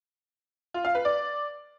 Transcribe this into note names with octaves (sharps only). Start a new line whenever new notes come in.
F4
F5
B4
D5